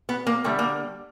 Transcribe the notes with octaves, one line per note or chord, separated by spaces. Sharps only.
B3
A#3
D3 G3 A3
A#3